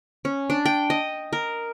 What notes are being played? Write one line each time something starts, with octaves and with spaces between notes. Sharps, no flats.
C#4
D4
G5
D#5
A#4